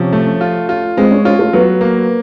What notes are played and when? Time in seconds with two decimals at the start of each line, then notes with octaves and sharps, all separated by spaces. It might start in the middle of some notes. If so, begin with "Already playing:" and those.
Already playing: C3 F3 C#4 C#5
0.13 A3
0.41 F4
0.69 F4
0.97 G#3 C4 C5
1.11 C#4 C#5
1.25 C#4 F4 C#5
1.39 A3 A4
1.53 F#3 B3 B4
1.81 A#3